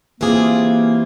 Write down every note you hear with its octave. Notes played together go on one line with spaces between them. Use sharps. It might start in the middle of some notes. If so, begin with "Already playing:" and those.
E3 G3 A#3 C4 F4 G#4